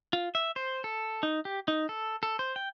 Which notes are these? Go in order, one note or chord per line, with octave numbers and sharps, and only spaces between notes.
F4
E5
C5
A4
D#4
G4
D#4
A4
A4
C5
G5